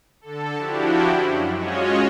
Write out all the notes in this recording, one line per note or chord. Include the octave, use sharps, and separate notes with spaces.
D3 A4
F3 D4 E4 F#4 G4
F#2
G#3 C#4 F4 F#4 C#5 D#5